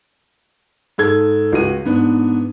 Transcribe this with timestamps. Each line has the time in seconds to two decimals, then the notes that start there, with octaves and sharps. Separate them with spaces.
0.98 G#2 A4 G#6
1.52 C#2 F#4 D#7
1.85 G#2 B3 D4